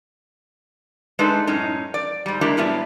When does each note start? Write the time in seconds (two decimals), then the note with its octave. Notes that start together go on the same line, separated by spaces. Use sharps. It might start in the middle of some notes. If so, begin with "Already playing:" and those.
1.19 G#3 A3 D4 D#4 A4 B4
1.47 F#2 A2 C#4 D#4
1.94 D5
2.26 G#2 G3
2.41 G#3 A#3 D4 E4 G4
2.57 A2 F#3 G3 B3 D4 E5